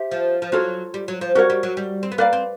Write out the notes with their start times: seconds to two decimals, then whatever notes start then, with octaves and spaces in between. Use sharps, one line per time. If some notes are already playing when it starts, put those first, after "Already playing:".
Already playing: G4 C5 E5
0.11 F3
0.42 F3
0.52 F#3 F4 A4 C#5
0.94 G3
1.08 F#3
1.21 F3
1.35 G3 F#4 A#4 C#5 F#5
1.50 G3
1.63 F#3
1.77 G3
2.03 C4
2.12 B3
2.18 A#3 B4 D5 F5
2.33 C4